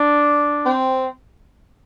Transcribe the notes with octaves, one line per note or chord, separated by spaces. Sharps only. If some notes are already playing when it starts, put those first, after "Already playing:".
Already playing: D4
C4